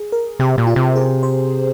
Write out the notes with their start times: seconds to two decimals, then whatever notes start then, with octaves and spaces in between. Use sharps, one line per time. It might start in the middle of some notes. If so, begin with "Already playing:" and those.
Already playing: G#4
0.12 A#4
0.39 C3 G4
0.58 A#2
0.67 F4
0.76 C3
0.96 G#4
1.23 C5